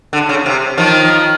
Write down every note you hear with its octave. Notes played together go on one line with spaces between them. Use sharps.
D3
C#3
C3
D#3 F3